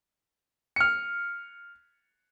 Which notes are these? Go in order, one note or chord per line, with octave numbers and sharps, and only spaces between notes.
F6 C#7